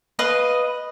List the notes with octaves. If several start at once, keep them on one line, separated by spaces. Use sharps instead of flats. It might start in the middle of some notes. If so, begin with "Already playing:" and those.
B4 D#5 F5